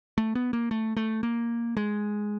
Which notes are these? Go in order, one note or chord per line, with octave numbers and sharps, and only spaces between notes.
A3
B3
A#3
A3
A3
A#3
G#3